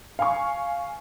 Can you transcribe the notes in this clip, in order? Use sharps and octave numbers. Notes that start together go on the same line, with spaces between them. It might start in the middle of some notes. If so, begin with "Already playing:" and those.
F5 G#5 C#6